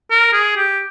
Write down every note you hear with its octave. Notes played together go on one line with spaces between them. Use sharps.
A#4
G#4
G4